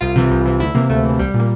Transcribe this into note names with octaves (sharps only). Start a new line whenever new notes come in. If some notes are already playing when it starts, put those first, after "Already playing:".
C2 F4
C3 E3
C2
C3 E3
D2 E4
C3 E3 A#3
D2 A3
C3 E3
C2 G3
A#2
A#3